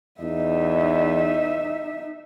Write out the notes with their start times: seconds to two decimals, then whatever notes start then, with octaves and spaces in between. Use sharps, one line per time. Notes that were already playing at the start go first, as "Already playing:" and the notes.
0.21 E2 D#4 E5